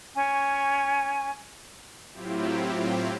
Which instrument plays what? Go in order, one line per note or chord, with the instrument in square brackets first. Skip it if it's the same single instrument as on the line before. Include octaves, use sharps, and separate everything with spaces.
[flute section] C#4 G#5 C#6
[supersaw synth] A2 F#3 C4 E4 F4 G4